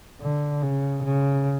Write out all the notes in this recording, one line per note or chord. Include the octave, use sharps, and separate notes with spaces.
D3
C#3
C#3